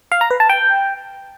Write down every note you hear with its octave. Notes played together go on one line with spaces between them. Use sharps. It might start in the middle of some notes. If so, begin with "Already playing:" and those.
F5
A#5
B4
A5
G5